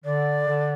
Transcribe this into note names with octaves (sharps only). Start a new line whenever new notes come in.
D3 D5
D3